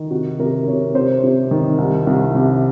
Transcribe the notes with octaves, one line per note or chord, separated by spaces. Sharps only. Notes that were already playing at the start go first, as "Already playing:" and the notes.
Already playing: D#3
C3 F#4
C3 A#4
C3 C#5
C3 C5
C3
D#3
C2
C2
C3